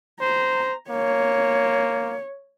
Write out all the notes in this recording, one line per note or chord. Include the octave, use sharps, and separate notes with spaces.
C5 A#5
A#3 C#5